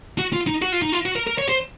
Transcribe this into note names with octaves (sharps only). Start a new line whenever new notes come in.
F#4
F4
D#4
F#4
F4
D#4
F4
F#4
A#4
A#4
C#5
C5